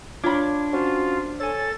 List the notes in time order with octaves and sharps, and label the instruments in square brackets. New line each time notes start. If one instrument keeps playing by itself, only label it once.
[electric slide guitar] D4 [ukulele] F4 C#5 B5 [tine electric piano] D6 G#6
[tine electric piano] C#4 F#4 [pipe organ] F4 [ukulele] C5
[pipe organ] A4 A6 [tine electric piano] C#5 G#5